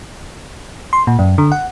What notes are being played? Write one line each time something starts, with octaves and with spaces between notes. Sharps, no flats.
C6
A#2
F#2
D3
F#5